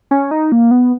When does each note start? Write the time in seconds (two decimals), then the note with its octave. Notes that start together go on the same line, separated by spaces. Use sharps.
0.11 C#4
0.31 D#4
0.52 A#3
0.71 B3